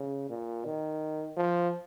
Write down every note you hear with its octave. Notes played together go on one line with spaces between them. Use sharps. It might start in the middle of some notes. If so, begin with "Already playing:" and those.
Already playing: C#3
A#2
D#3
F3